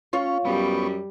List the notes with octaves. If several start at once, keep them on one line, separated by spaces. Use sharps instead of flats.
C#4 F4 C#5
F#2 G3 B3 C#6